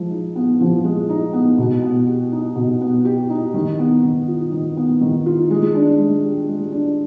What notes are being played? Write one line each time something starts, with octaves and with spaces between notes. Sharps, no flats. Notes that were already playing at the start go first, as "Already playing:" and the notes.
Already playing: F3 G#3
D#4
B3
F3
G#3
D#4
B3
B2
B3
G4
D#4
B2
B3
G4
D#4
D#3
B3
D#3
F4
D#3
B3
D#3
F4
G#3
D4
G#3
G4
G#3
D4